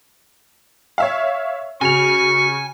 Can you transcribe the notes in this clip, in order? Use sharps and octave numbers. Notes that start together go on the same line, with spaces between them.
C#5 E5 F5
C#3 F#4 G#5 C#6 F7